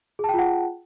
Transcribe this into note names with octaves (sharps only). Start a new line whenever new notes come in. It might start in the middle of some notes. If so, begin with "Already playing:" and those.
F4 G#4 F#5 G5 A5